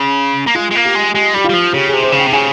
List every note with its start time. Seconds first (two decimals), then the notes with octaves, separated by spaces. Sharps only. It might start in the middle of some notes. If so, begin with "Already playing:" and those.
Already playing: C#3
0.47 A#3
0.55 G#3 F4
0.71 G#3
0.75 A#3
0.85 G4
0.95 G#3
1.14 G#3 G4
1.34 G3 G4
1.44 G3 F4
1.53 F3
1.74 C#3 G4
1.88 G#4
1.93 C3
2.03 C5
2.12 C#3
2.18 G5
2.27 C3
2.32 C#3 G#5